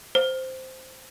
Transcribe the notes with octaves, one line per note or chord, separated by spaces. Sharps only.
C5